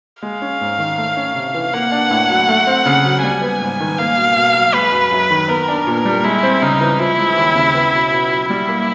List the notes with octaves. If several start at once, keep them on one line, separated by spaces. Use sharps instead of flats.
G#3 F5
C#4
G#2
D#3
A3
C#4
C3
E3
A#3 F#5
D4
A2
F#3
A3
C4
C#3
F#3
G3 G#5
B3
G#2
D#3
A#3 F5
B2
B2
F#3
G#3 B4
F#2
F#2
D#3
B3 A#4
D4
A#2
G3
G#3 E4
C4
C#3 D#4
E3
F3 E4
G#3
D#2
C#3
B3
B2
B2
F#3
G3 E4
A#3